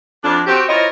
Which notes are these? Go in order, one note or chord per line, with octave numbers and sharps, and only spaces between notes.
F2 D4
C4 F#4 G4
E4 F4 A#4 C5 C#5 D#5